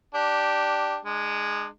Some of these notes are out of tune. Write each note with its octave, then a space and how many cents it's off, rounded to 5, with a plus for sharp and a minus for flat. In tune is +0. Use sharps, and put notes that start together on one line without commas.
D4 +5 G4 -10
G#3 +0 D4 +30